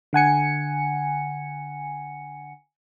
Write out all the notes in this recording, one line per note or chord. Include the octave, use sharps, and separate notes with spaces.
D3 F#5 G#5 C#7